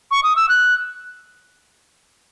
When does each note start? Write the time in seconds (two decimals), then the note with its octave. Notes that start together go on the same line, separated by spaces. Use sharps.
0.11 C#6
0.23 D#6
0.36 E6
0.49 F#6